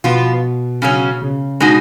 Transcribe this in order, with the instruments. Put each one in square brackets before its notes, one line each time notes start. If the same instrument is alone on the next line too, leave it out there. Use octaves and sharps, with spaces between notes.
[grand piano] B2 [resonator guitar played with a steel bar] F3 B3 F4
[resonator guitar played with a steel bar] C#3 F#3 C#4
[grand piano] C#3
[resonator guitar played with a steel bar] B2 G#3 D#4 F#4